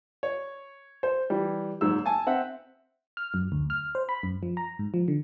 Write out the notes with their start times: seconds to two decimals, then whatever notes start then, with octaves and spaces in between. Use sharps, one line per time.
0.23 C#5
1.03 C5
1.30 E3 G3
1.81 F#1 G#2 E6
2.06 G#5 A5
2.27 C4 E5 F#5
3.17 F6
3.34 F#2
3.52 D2
3.70 F6
3.95 C5
4.09 B5
4.23 F#2
4.43 F3
4.57 A#5
4.79 G#2
4.94 F3
5.08 D3